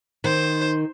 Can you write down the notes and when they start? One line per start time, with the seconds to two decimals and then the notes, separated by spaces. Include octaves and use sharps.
0.24 D#3 C5